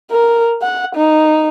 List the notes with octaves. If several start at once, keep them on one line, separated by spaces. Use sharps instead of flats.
A#4
F#5
D#4